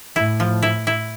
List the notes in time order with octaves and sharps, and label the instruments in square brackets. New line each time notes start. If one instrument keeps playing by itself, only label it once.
[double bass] A2 [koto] E4
[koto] F3
E4
E4